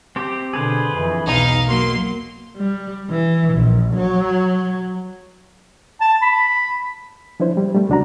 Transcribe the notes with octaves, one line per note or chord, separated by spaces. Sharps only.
C4 G4
B2 D3 G#4 B4 C5
F2 E3
B1 E2 D#4 F5
F#3 A#3 C6
G3
E3
A#1
F#3
A5
B5
F3 D4 E4 C5
G3
G3 A3
C#2 D4 F#4 A#5